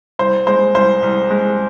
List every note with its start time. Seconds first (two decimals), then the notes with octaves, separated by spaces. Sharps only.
0.19 C2 C5
0.47 G#3 C5
0.75 C2 C5
1.03 C2
1.30 G#3